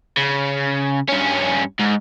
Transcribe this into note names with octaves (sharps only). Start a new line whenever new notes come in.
C#3
G2 C#4
G#2